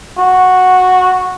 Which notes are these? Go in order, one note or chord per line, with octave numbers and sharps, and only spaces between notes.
F#4